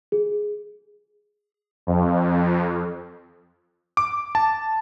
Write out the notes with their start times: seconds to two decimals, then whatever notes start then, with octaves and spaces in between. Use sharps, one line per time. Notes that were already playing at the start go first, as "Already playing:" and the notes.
0.12 G#4
1.87 F2
3.97 D6
4.35 A5